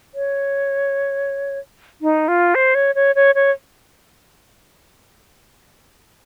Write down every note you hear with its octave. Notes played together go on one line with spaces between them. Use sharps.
C#5
D#4
F4
C5
C#5
C#5
C#5
C#5